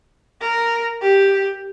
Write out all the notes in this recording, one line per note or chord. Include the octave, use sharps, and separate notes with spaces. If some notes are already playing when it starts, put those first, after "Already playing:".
A#4
G4